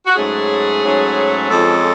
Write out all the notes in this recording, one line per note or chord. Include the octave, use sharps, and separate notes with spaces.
F#4
G#2 F#3 A3 C#4 G#4
G#2 F#3 A3 C#4
F2 F3 G#3 C#4 A4